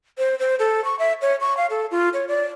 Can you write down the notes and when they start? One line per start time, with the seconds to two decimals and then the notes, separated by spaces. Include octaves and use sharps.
0.18 C5
0.39 C5
0.59 A4
0.85 C#6
0.99 E5
1.22 C#5
1.40 C#6
1.57 F5
1.70 A4
1.91 F4
2.14 C#5
2.28 D5